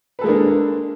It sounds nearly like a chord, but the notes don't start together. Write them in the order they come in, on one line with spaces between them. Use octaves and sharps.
B4 A4 G#3 A#3 D4